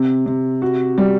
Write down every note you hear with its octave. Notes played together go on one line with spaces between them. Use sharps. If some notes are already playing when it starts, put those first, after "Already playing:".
Already playing: C3
C3
F#4
G3